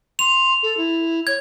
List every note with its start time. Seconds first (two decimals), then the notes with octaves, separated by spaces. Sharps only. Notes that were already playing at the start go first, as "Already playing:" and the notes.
0.19 C6 F7
0.62 A4
0.77 E4
1.27 C#5 G#6